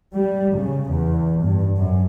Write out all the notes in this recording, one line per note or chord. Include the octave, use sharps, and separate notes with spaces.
G3
C#3
E2
G2
F#2